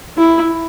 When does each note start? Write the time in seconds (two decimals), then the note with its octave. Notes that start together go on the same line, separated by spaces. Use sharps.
0.17 E4